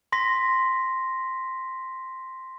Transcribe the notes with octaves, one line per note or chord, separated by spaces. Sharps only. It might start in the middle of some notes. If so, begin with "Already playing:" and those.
C6 A#6 B6